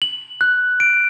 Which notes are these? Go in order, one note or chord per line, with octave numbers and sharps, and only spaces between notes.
F#7
F#6
D7